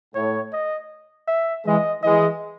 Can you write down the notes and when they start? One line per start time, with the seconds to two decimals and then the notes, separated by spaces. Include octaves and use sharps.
0.15 A2 C#5
0.53 D#5
1.28 E5
1.66 E3 G#3 D#5
2.03 E3 G#3 D#5